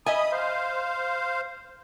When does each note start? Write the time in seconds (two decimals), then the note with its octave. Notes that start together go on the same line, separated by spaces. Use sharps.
0.06 D#5 E5 G#5 B5 D#6
0.32 C5 F5